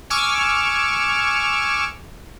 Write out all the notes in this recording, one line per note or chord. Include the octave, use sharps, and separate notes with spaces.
G#5 C#6 D6 E6 F6